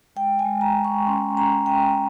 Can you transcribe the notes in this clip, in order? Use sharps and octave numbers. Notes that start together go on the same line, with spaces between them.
G#3 G5
G#5
G#3
A#5
G#3
C#6
C#4 C6
C#4 A#5
C#4 G5